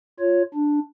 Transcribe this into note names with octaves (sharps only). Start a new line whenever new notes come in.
F4 C#5
D4